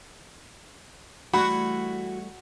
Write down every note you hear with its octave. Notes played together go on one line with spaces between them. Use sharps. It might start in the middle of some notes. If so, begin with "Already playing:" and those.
E3 G3 A3 F#4 B5